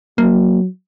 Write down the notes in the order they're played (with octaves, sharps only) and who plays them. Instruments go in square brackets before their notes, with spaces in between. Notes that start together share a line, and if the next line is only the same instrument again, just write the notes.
[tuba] F#3 [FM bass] A#3